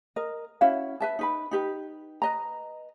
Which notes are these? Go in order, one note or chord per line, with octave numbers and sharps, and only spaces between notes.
A#4 D#5
C#4 E4 F#4 F5
B4 E5 A5
D#4 B4 B5
D#4 G4 B4
B4 D#5 A#5